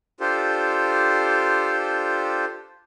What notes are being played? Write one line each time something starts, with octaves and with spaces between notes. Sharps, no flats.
D4 F4 G4 A4 C5